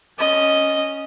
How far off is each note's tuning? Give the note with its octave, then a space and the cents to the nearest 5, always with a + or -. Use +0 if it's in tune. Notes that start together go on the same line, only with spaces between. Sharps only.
C#4 +0 D#5 +0